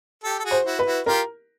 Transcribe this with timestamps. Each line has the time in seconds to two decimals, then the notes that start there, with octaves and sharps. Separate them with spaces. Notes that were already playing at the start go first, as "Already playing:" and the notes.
0.23 G4 A4
0.39 A4
0.45 F#4 G#4
0.51 C5
0.65 E4 F#4
0.79 B4
0.85 E4 F#4
1.06 F4 G4 A#4